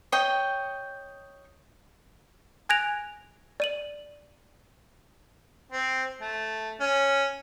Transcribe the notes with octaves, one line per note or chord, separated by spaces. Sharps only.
C#5 D#5 G5
G#5 F#6 G#6 A#6 D7 F7
D5 D#7 F#7
C4
A3
C#4